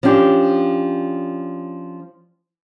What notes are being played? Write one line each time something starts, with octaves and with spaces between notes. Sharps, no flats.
F3 C#4 D4 G4